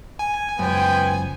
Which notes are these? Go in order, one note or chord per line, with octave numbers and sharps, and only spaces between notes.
G#5
C#2 F#2 B3 C5 G5